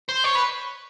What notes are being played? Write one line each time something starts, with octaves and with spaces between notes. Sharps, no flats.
C5
C#5
B4